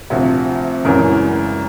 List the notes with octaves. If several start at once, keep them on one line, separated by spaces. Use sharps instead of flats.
D2 C3 F3
G#1 F#2 C#3 E3 A#4